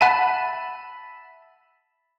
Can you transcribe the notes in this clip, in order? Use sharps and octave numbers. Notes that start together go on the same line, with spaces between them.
E5 F#5 A5 B5 D#7